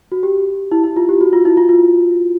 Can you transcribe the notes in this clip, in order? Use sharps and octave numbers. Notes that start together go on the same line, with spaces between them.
F#4
G4
E4
E4
F4
G4
F#4
F4
E4
F4
F4